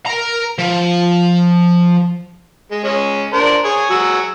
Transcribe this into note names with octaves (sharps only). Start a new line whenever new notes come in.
A#4 A#5
F3
G#3
G#3 C#4
D4 A#4 C5
G#4 C#5
F#3 G#4 E6